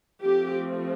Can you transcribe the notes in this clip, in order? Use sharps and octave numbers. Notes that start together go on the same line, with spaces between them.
F3 A3 C4 G4